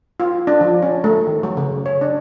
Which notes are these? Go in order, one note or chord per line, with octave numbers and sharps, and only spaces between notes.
F4
D4
F3
C#4
A3
D#3
F#3
C#3
C#5
D4